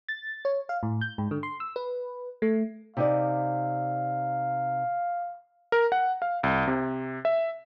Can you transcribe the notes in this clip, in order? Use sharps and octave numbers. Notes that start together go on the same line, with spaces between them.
A6
C#5
F5
A2
G6
G#2
D3
C6
E6
B4
A3
C3 D#4 D5 F5
A#4
F#5
F5
C2
C3
E5